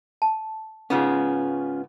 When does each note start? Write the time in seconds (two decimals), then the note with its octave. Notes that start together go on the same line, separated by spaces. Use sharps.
0.22 A5
0.90 G#2 C#3 B3 C#4 F4 G#4